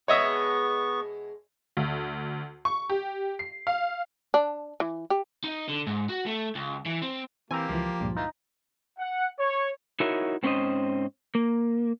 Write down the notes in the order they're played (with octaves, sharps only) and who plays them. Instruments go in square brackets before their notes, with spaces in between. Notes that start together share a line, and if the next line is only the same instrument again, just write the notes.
[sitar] B2 G#3 [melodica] B3 C#6 [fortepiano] C#5 D#5 E5
[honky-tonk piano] D2
C#6
G4
C7
F5
[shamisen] D4
E3
G4
[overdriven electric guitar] D#4
D3
G#2
F#4
A3
C#2
E3
C4
[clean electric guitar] E3 C4 [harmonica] A#3 G4 [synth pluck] G#5 A#5
[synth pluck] C#2 E3 [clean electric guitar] F3
[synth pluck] C#2 G2 A#2
[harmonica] E3 F4 [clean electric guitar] D#4
[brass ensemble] F#5
C#5
[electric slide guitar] D#4 E4 F#4 A#4 C#5 E5
G#2 C4 C#4 E4 C5 D#5
A#3